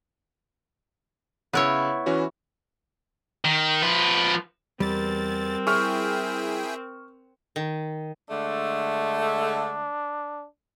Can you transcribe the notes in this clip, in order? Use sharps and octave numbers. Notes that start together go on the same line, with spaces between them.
C#3 B3 E4 C#5
E3 C#4 F#4
D#3
F3 B4
E2 G3 C4 A#4 A6
E4 G#4 G5 C#6 F6
D#3
D3 G#3 A3 D4